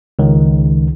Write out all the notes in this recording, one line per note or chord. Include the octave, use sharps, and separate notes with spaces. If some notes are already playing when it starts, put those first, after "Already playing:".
C#2 D#3